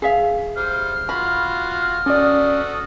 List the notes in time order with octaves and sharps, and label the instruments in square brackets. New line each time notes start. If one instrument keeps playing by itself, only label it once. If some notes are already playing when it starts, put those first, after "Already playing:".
[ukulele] G#4 E5 F5
[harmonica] G3 C5 [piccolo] F6
[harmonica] F4 F#4 [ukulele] B5
[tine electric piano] C#4 D5 [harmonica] F#4 A4 D#6